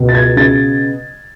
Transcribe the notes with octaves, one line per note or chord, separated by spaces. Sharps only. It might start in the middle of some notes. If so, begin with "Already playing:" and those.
Already playing: C#2 B2
A6
G#6
C#3 A6